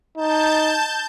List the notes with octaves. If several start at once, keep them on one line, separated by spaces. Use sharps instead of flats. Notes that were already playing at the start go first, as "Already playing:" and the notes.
D#4 A5 G6